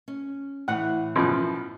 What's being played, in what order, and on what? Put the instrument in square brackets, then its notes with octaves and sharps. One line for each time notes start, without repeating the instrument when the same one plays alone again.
[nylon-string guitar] C#4
[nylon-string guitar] A2 E3 [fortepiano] F#5
[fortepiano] F#2 B2 F3